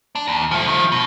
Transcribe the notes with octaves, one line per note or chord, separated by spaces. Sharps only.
D4
D#2
F3 A3
D#3 F3
B2